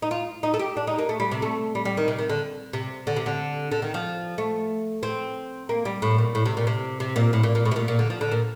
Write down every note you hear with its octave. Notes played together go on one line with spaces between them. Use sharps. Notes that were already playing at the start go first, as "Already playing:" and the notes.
D#4
F4
D#4
A4
G4
D4
D#4
A#3
A3
G3
C3
A3
G3
G3
D#3
C3
D#3
D3
C3
D3
C3
D3
D3
D#3
F3
A3
C4
A#3
G3
A2
A#2
A2
C3
A#2
C3
C3
A#2
A2
A#2
A#2
A2
C3
A#2
A#2
D3
F3
D3
A#2